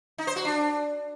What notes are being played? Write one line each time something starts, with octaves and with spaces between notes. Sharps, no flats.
D#4
C5
F#4
D4